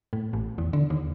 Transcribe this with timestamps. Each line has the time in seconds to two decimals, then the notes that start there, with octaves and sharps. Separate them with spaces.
0.13 A2
0.33 A1
0.58 E2
0.73 D3
0.90 D#2